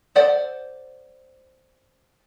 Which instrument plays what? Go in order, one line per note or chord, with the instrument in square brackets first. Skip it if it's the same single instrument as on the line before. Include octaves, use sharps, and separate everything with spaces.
[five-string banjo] A4 C5 D5 F#5